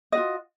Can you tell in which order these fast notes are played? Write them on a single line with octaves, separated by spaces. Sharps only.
D#5 F#4 F4